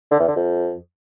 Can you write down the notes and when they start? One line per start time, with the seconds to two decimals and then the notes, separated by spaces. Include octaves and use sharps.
0.11 D3
0.19 E2
0.28 D3
0.36 F2